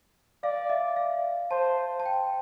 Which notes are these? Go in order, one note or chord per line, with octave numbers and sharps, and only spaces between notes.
D5 F5
E5
F5
C5 A5
A5
G5